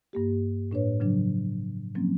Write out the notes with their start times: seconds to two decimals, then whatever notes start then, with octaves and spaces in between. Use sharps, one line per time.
0.13 G2 A#3 G4
0.71 A2 D4 B4 C#5
1.00 C#3 F3 F#3 D4
1.95 F3 F#3 A#3 C4 C#4